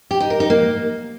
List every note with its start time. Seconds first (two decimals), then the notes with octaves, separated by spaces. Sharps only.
0.11 G4
0.20 D#4
0.30 A#4
0.40 D#4
0.50 A#3